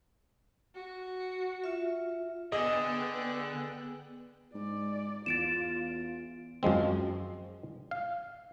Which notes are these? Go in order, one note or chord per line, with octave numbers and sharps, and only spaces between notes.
F#4
F4 E5
D3 B3 G#4 D#5 G5 G#5 E6 F#6
G#2 D5
E2 F4 A6 D7 E7
F#2 F3 G#3 C4
F5